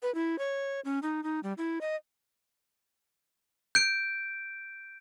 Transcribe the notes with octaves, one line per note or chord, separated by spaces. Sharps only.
B4
E4
C#5
C#4
D#4
D#4
G3
E4
D#5
G6 D7